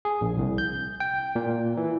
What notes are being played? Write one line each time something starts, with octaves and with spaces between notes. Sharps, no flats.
G#4
A#1
C2
G6
G5
A#2
E3